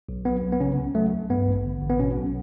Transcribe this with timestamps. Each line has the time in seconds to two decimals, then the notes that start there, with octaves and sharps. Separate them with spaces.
0.09 B1
0.25 F#3 B3
0.43 B1
0.52 B3
0.60 C#3 C#4
0.78 C#2
0.95 F#3 A3
1.12 C#2
1.30 G2 B3
1.47 A1
1.65 D3
1.82 A1
1.90 B3
1.99 B2 C#4
2.17 B1